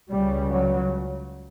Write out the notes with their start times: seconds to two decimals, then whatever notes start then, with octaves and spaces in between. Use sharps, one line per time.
0.10 C#2 C#3 G3
0.51 F#3